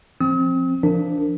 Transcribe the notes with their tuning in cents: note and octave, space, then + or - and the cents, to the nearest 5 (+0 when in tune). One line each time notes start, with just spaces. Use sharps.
F3 +0 C4 +15 D#6 +45
F3 -20 D4 -5 A#4 -25